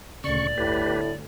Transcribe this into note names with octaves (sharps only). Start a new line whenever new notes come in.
D2 A#2 C#3 D5 C#6
G1 D2 A2 G4 B4